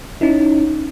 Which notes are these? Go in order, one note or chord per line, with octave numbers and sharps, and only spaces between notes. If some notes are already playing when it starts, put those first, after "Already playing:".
C#4 D#4 E4